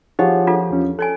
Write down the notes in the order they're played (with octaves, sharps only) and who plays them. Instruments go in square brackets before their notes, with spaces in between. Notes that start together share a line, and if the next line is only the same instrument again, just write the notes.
[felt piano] F3 G4 [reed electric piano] G#4 C#5 F#5 [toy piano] D#5
[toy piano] D4 F4 A4
[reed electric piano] E2 C#4
[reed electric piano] A4 [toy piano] C#5 D5 G#5